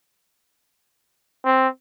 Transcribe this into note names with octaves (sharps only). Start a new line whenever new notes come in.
C4